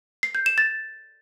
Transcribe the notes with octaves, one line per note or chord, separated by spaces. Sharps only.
C7
G6
E7
A6